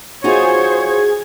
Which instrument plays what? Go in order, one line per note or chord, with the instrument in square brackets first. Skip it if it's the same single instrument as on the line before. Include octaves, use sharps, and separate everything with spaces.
[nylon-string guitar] D#4 F4 F#4 [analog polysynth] G#4 G#6 [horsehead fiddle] C5 C#5